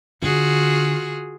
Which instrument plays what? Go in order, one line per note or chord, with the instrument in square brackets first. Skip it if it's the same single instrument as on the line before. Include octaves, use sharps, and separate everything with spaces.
[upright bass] D3 [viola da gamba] F4 F#4 G#4